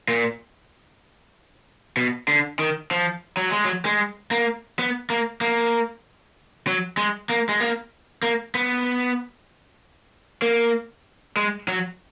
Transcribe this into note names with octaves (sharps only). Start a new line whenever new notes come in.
A#2
B2
D3
D#3
F3
F#3
G#3
F#3
G#3
A#3
B3
A#3
A#3
F#3
G#3
A#3
G#3
A#3
A#3
B3
A#3
G#3
F#3